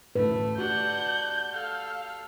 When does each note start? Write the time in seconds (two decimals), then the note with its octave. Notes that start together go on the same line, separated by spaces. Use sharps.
0.16 A1 D2 A2 A3 B4
0.58 D4 F#4 G4 F#5 G6
1.54 A4 F5